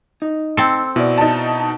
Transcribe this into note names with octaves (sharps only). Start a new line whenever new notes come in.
D#4
C4 A4
B2 E4 D5
D#4 A5